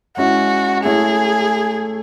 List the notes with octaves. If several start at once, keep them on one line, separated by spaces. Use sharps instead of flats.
G#3 C#4 E4 F#4
A3 E4 G#4 A4 C#5